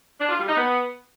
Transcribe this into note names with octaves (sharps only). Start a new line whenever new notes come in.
D4
F4
G3
D#4
B3